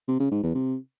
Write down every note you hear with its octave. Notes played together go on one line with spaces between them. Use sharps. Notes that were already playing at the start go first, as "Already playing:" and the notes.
C3
C#3
G#2
E2
C3